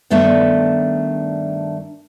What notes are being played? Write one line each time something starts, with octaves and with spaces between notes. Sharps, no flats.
G2 D#3 A3 B3 D4 E5